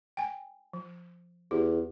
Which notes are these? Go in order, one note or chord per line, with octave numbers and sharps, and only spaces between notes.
G5 G#5
F3
E2 G4